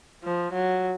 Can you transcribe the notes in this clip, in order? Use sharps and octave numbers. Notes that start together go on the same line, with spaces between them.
F3
F#3